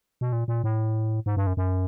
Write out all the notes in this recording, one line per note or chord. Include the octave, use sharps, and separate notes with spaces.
B2
A#2
A#2
A2
G#2
G2
F#2
F#2